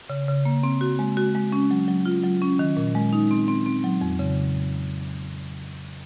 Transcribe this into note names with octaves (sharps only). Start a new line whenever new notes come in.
C#3
C#3
A#3
C4
F#4
G#3
F#4
G#3
C#4
F#3
F#3
F4
F#3
C#4
D#3
A#2
G#3
D#4
C4
C4
C4
F#3
F2
C#3